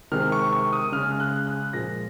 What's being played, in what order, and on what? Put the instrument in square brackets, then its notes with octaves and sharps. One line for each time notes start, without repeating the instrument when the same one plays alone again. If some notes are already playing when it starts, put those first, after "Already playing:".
[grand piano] C3 D#3 G#3 F6
C#6
C#6
D#6
C#3 G#3 F6
F6
F#6
F#6
A#2 F3 G#3 A#6